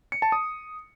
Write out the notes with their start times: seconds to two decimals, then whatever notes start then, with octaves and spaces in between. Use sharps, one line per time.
0.12 C#7
0.22 A5
0.32 D#6